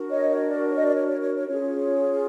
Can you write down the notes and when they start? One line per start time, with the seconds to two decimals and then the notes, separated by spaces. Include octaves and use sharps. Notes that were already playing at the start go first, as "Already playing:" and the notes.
Already playing: D4 F#4 A#4
0.10 C#5 D#5
0.29 C#5
0.49 D5
0.69 C#5
0.76 D#5
0.81 D5
0.95 C#5
1.08 C#5
1.21 C#5
1.35 C#5
1.47 C#4 F4 G#4 C#5